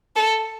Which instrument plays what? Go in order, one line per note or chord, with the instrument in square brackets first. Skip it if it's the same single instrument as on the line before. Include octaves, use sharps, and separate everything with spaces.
[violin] A4